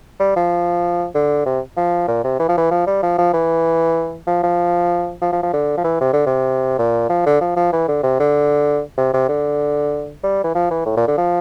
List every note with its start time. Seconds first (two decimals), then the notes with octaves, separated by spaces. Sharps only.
0.20 G3
0.36 F3
1.15 D3
1.46 C3
1.77 F3
2.08 A#2
2.24 C3
2.40 E3
2.49 F3
2.58 E3
2.71 F3
2.87 G3
3.03 F3
3.18 F3
3.34 E3
4.27 F3
4.43 F3
5.22 F3
5.33 F3
5.43 F3
5.53 D3
5.77 F3
5.84 E3
6.01 C3
6.13 D3
6.26 C3
6.79 A#2
7.10 F3
7.26 D3
7.41 F3
7.56 F3
7.73 E3
7.88 D3
8.03 C3
8.20 D3
8.97 C3
9.13 C3
9.29 D3
10.24 G3
10.44 E3
10.55 F3
10.71 E3
10.86 A2
10.97 A#2
11.08 D3
11.18 F3